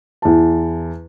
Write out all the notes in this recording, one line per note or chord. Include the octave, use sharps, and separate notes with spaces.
E2 A5